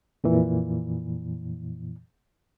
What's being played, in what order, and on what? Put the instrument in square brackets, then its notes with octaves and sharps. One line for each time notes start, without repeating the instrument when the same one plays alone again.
[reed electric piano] F2 A#2 E3